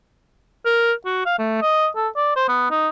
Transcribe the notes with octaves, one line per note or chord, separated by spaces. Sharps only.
A#4
F#4
F5
A3
D#5
A4
D5
C5
B3
D#4